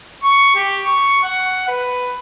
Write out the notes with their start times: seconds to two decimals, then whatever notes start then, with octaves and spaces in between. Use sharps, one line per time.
0.23 C#6
0.55 G4
0.85 C#6
1.23 F#5
1.68 B4